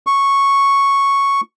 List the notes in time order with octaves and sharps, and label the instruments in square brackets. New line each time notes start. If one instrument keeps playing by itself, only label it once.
[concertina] C#6